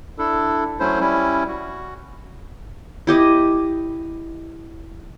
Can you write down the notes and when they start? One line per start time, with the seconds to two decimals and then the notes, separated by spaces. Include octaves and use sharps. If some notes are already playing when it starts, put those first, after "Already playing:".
0.18 D4 E4 A4
0.80 F#3 A3 C#4 E4 C5
1.00 G3 C#4 E4
1.48 F#4
3.07 E4 G4 D#5